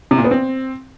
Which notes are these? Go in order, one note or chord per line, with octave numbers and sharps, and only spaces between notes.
C3
A#2
B3
C4